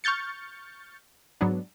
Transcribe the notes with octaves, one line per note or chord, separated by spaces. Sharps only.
C#6 F6 G6 A6 C#7
G#2 F#3 B3 D4